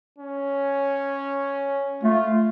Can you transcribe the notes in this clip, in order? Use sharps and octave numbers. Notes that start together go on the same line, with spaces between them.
C#4
A3 F4